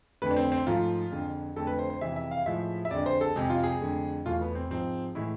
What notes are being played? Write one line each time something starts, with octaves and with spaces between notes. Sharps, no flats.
F2 D3 A3 B4
D4
C4
C4
G#2 F3 A3 F4
F2 D3 G#3
F2 D3 A3 A4
B4
C5
C5
F2 C3 E3 G#3 E5
E5
F5
A2 F3 G#3 E5
E5
F2 D3 G#3 D5
C5
A4
F2 C3 G#3 G#4
F4
G#4
F2 D3 A3
E2 B2 A3 F4
B3
C4
G#2 F3 G#3 C4
A2 E3 G#3 E4